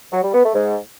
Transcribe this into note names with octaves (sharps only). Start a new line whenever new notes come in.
F#3
G3
B3
A3
G#2